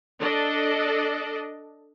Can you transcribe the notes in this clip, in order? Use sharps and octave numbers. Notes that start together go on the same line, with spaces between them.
D4 A4 D5 D#5